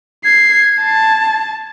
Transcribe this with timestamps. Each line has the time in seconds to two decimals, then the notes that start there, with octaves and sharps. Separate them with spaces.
0.25 G#6 C7
0.82 A5